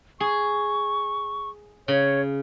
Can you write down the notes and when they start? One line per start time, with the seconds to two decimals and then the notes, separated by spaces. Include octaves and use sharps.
0.20 G#4 C#6
1.88 C#3 C#5